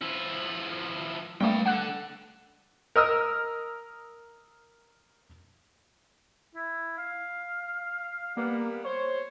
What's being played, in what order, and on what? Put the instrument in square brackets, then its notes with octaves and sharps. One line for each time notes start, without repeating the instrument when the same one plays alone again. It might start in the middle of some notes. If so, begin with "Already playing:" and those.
[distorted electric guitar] F3 E4
[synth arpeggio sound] G3 A3 A#3 [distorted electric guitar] B4 G5
[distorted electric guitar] D4 A4 [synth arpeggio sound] F#5 F#6
[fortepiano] A#4 D#5 E6 F6
[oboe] E4
F5
[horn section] G3 B3 [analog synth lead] A#3
[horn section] C5 [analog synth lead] C#5